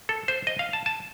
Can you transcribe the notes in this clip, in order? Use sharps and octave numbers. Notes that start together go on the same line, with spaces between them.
A4
C5
D#5
F5
A5
A5